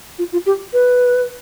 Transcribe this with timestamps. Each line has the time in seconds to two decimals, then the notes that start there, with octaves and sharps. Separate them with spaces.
0.19 F4
0.33 F4
0.46 G4
0.73 B4